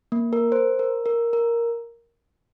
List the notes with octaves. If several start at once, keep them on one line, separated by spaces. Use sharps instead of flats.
A#3
A#4
C5
A#4
A#4
A#4